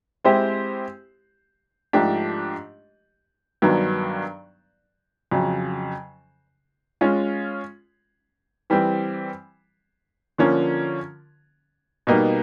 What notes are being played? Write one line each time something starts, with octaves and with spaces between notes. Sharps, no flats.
G#3 C4 E4 G4 C5
G#2 F3 A3 D4 G4
G2 D#3 F#3 B3 D4
F2 C#3 F#3
G#3 C#4 F4
E3 G3 C4
D3 F3 A#3 C#4
B2 G3 A#3 D#4